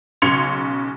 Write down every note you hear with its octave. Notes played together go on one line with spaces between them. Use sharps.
B1 C#3 C6 G#6 C#7 F7